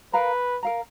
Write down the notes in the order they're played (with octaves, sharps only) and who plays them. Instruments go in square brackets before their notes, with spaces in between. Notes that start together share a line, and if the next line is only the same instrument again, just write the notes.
[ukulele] A#4 F5 A#5 [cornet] B4
[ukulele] A#4 F5 A#5